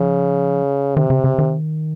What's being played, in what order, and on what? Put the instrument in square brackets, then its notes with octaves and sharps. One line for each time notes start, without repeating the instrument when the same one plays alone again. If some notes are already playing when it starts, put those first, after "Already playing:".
Already playing: [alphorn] C#3 [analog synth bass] F3
[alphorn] C3 [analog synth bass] D#3
[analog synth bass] C#3
C#3
D#3